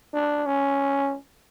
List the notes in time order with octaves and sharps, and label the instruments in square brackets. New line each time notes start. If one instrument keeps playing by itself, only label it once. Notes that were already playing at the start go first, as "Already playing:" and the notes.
[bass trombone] D4
C#4